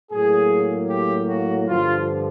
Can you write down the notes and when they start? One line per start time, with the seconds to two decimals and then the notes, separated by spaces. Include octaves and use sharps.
0.12 A2 F#3 A#3 G#4
0.90 G4
1.29 F#4
1.68 G2 D3 F3 F4